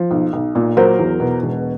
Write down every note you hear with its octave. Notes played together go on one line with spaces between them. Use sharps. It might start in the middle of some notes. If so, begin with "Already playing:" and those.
Already playing: F3
B1
B1
A#2
F#3 A#4 C5
E2
B2
E1